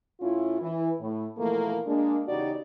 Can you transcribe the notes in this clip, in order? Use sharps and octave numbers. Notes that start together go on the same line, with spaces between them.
A2 C#4 E4 F4
E3
A2
B2 E3 F3 A3 A#3
G#3 A#3 D4
E2 C#3 D#4 F#4 G4 D5